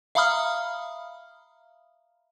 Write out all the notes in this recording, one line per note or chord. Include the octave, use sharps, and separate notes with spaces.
E5 F5 A#5 B5 D#6 F6